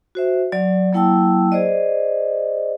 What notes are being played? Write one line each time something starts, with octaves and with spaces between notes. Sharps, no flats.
F#4 C5 E5
F#3 D5
F#3 A#3 E4 G5 A5 E6
G#4 C5 D5 D#5